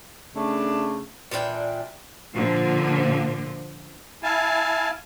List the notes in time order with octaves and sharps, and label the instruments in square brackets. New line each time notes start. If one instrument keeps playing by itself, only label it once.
[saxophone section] C#3 A3 D4
[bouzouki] A#2 E3 D4 G5
[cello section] A#2 D3 F3
[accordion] E4 F5 G#5 A5